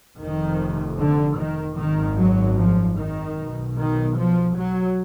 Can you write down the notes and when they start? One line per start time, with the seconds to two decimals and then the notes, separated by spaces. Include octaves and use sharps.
0.19 F1 F2 D#3
0.99 D3
1.38 D#3
1.77 G#1 F#2 D#3
2.18 F#3
2.58 F3
2.98 D#3
3.37 B1 B2
3.77 D#3
4.16 F3
4.56 F#3